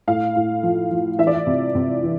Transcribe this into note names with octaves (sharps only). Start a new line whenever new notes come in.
A2 F5
A2
F3
F3
E3 E5
D5
E5
C3
C3
E3